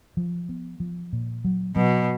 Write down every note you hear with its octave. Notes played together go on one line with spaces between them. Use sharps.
F3
B3
F3
A#2
F#3
B2 F#3